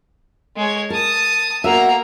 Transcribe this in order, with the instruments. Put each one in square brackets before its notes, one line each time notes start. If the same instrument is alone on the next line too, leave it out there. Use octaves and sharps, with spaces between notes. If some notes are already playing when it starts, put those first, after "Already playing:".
[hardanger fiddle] G#3 C#5
[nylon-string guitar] A#4 [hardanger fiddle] A5 D#6
[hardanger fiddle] A#3 A#5 [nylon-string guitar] B3 F#4 E5